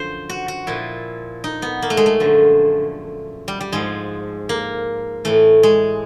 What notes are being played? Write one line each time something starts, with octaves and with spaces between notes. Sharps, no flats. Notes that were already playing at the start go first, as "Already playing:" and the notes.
Already playing: F#2 D3 F3 C5
F#4
F#4
A#2 F3 E4
D#4
B3
A#3
A3
G#3
A3
F#2 D3 F3
G3
G3
G#2 F3 G#3
A#3
A2 E3 A3
G#3